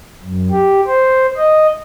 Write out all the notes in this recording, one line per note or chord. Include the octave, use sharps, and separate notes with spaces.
F#2
G4
C5
D#5